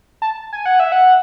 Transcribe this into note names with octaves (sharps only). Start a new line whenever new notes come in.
A5
G#5
F#5
E5
F#5